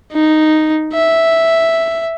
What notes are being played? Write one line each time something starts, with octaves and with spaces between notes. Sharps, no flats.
D#4
E5